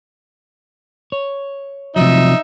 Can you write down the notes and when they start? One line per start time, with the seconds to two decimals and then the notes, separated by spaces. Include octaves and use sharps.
1.12 C#5
1.96 C3 F3 F#3 D#4 E5